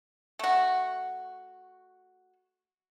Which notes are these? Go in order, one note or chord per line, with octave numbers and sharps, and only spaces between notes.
A3 F#4